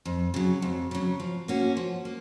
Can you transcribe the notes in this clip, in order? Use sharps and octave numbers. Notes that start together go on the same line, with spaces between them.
F2
C#3 F#3
F2
C#3 F#3
F3
A#3 C#4 F#4
F3
A#3